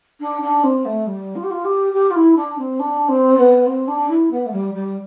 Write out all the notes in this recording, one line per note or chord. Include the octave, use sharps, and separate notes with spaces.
D4
D4
C4
A3
G3
F4
G4
F4
G4
G4
F4
E4
D4
C4
D4
C4
B3
C4
D4
E4
B3
A3
G3
G3